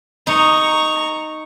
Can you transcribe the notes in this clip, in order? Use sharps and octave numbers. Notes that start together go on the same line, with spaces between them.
D#4 A#5 C#6